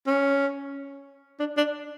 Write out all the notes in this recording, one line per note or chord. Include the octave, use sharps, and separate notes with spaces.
C#4
D4
D4